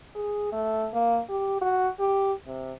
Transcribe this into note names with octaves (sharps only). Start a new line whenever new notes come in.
G#4
A3
A#3
G4
F#4
G4
C3